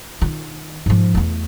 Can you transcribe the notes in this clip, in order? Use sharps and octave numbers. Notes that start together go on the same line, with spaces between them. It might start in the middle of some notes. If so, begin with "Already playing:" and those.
D#3 F4
G#2 F3
E2 A3